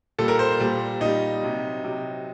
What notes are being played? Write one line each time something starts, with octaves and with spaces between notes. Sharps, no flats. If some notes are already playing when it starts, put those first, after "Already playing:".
A#2 G3 A4
A#4
C5
A#2 G3
A#2 G3 D#4
C3 F#3
C3 F#3